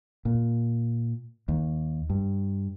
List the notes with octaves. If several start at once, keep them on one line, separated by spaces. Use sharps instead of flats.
A#2
D#2
G2